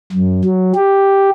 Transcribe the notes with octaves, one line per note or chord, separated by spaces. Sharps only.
F#2
F#3
G4